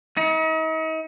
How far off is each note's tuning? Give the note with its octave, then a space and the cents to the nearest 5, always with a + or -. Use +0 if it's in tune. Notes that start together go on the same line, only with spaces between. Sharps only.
D#4 +40